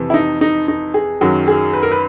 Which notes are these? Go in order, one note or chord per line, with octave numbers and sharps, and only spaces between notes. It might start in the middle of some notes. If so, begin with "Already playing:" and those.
Already playing: F2 C3 E3
E4
D#4
D#4
D#4
G#4
F#2 D#3 F#3 G#4
G#4
B4
A#4
B4